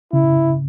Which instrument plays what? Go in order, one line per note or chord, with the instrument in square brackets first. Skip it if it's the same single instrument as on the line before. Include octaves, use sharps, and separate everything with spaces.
[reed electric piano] C#3 [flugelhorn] E4